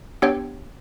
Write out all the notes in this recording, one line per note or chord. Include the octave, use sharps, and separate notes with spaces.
B3 D4 G4 C#5 G5